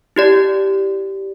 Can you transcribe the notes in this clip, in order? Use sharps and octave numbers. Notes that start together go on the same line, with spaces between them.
E4 G4 D5